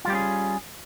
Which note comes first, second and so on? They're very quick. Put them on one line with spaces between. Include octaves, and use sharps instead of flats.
F4 G3 G4 C#4 G#4